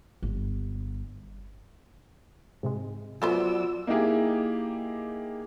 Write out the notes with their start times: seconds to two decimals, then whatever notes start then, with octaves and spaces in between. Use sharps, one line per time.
0.22 G1
2.63 G#2 C3 G#3
3.22 F#3 A3 B3 F4 C5 D5 E6
3.87 A#3 D#4 E4 G4 G#4